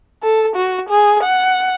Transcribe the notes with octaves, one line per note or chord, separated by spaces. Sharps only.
A4
F#4
G#4
F#5